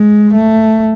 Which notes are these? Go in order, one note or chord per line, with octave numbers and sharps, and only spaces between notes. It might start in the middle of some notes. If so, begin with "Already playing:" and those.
Already playing: G#3
A3